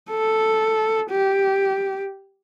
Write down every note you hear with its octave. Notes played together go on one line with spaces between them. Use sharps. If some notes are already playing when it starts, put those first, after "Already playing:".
A4
G4